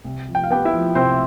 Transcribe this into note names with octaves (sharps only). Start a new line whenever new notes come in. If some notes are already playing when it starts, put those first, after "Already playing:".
C2
F3
G5
F5
B3 G4 G5
E4 E5
F3
C3 C4 C5